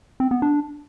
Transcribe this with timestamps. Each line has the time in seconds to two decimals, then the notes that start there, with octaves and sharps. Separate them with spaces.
0.20 C4
0.31 B3
0.42 D4